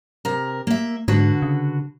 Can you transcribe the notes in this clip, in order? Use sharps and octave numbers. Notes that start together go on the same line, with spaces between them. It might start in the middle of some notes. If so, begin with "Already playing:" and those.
C3 A#4
A#3 E5
G#2 D3 F#4 B4
C#3